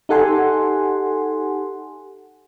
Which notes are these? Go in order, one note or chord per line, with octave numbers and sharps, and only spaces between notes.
D#4 G4 A4 F#5 G#5 C6